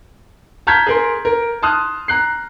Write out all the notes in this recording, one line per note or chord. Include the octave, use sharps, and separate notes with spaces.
A5 A#5 F6 G6 G#6 B6
G#4 A#4 C6
A#4
A5 C6 D#6 F6 F#6
A#5 F#6 C7